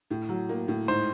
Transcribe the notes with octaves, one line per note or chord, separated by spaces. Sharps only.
A2
F#3
A#3
A2
G#2 C5